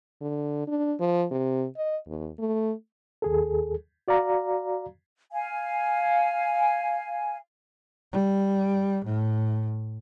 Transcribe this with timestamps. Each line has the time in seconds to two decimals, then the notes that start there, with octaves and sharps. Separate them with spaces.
0.21 D3
0.68 D4
1.00 F3
1.31 C3
1.77 D#5
2.07 D#2
2.39 A3
3.22 D#2 G#4 A4
4.08 F#4 D5 F5 A#5
5.32 F5 G#5
8.12 G3
9.04 A2